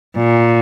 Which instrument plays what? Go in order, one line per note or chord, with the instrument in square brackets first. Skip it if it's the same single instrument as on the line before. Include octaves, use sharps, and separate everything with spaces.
[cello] A#2